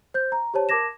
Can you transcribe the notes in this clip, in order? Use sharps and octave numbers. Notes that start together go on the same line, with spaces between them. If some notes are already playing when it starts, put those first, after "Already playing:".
C5 G6
A#5
G4 C5 C#5 A5
A#4 A5 D6 G#6 A#6 E7